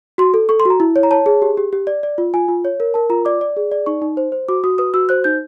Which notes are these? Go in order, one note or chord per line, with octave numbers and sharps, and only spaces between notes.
F#4 C6
A4
A4 C#6
C6
F#4 A#5
E4
C#5
A#5
C#5 A5
G#4
G4
G4
G4
D5
D5
F4
F4 G#5
F4
C#5
A#4
A#4 A5
F4 A#5
D5 D6
D5
G#4
D5
D#4 C#6
D#4
C5
C5
F#4 D6
F#4 D#6
B4 D#6
F#4 E6
C5 F#6
D#4 G6